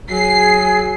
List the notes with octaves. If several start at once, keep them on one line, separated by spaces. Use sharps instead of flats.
F#3 G#4 G#5 C7